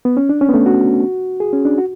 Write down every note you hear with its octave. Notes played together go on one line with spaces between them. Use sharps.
B3
C#4
D4
C#4
B3
A3
F#4
G#4
C#4
D4
F#4